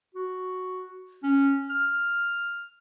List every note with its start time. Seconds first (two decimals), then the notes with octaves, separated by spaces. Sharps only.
0.15 F#4
1.23 C#4
1.69 F6